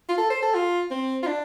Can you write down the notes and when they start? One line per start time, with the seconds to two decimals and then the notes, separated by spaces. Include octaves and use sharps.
0.09 F4
0.18 A4
0.30 C5
0.43 A4
0.54 F4
0.91 C4
1.23 F4
1.26 D4